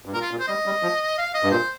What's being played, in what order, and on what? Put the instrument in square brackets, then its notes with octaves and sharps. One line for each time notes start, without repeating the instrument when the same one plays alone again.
[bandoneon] G2
[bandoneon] A#2 [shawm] A#4
[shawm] F4
[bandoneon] A#2
[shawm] C5
[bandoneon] G3 [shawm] D#5
[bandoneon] G3
F3
[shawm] F5
D#5
[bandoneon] G2
[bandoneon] A#2 [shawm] C5